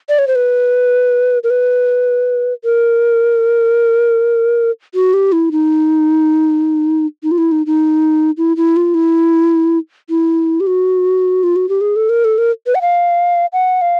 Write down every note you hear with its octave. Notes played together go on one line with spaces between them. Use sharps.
D5
C#5
C5
B4
A#4
B4
A#4
F#4
G4
E4
D#4
D#4
F4
E4
D#4
D#4
E4
E4
F4
E4
E4
G4
F#4
F4
F#4
G4
G#4
A4
A#4
A4
A#4
B4
F#5
F5
F#5
F5